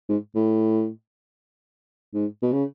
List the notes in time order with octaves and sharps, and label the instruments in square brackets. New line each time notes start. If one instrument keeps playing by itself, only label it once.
[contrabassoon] G#2
A2
G#2
B2
C#3